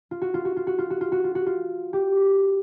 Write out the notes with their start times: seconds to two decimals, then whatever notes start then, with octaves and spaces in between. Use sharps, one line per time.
0.11 F4
0.22 F#4
0.34 F4
0.45 F#4
0.57 F4
0.67 F#4
0.79 F4
0.90 F#4
1.01 F4
1.12 F#4
1.24 F4
1.35 F#4
1.47 F4
1.93 G4